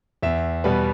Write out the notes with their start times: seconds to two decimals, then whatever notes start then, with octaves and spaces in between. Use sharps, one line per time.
0.22 E2 E5
0.64 B2 G3 B3 B4